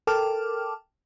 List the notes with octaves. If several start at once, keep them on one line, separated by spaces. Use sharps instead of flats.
A4 A#4 G5 A5 D6 F6